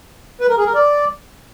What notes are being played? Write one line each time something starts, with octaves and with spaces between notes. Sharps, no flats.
B4
A#4
G#4
A#4
D5